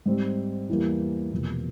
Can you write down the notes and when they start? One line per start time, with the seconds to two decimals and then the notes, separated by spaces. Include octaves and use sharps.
0.06 G#2 G3 C4
0.69 E2 E3 G3 A#3
1.32 E1 E2 C3 F3 A#3